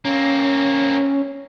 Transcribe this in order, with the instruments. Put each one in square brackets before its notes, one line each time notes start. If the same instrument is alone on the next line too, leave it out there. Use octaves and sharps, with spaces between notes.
[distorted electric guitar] A#3 C4 [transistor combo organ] C#4